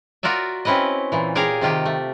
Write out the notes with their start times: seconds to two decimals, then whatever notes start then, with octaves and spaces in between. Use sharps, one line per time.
0.23 F4 F#4 A#4 D5 E5
0.65 C4 C#4 E4 B4 D#5
1.12 A#2 E3
1.35 G4 G#4 A#4 C#5 F5
1.61 C3 D#3 F4 G4
1.85 A3